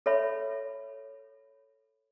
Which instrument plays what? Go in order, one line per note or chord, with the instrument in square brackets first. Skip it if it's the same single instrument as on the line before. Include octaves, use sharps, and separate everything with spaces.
[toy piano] A4 C#5 E5 B5